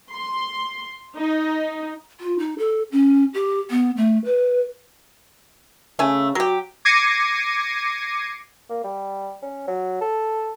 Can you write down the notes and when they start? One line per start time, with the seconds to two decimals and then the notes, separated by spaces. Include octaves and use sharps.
0.12 C6
1.16 D#4
2.20 F4
2.39 D#4
2.58 A4
2.92 C#4
3.34 G4
3.71 B3
3.97 A3
4.25 B4
5.99 C#3 A3 G#5
6.35 F#3 F#4 G4
6.85 D6 G#6 A#6 C7 C#7 D#7
8.70 A#3
8.84 G3
9.42 C#4
9.68 F#3
10.01 A4